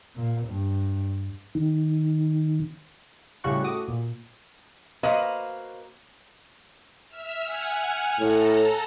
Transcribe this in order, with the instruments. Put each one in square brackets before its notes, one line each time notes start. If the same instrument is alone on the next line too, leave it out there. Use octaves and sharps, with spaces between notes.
[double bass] A#2
G2
[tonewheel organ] D#3
[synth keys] A2 C#3 G3 F#4 C#6 F#6
A2 F#4 D6 D#6
A#2
[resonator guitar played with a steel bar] A#3 F#4 B4 C5 D#5 F5
[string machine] E5 E6 F6
F#5 G#5 F6
[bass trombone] A2 [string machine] A4 A#5